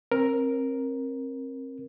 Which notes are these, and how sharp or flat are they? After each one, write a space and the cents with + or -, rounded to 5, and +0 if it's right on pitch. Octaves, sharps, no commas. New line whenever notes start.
C4 +35 A#4 +5